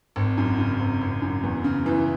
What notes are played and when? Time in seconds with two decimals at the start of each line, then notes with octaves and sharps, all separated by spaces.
0.16 G#1
0.37 F#2
0.58 C#3
0.80 G#1
1.01 G#1
1.22 F#2
1.43 E2
1.64 C#3
1.86 E3